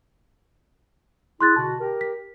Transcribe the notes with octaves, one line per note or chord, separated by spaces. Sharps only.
E4 G#4 C6 F#6 A6
B2 D3 F#4 A5
G4 A#4
B6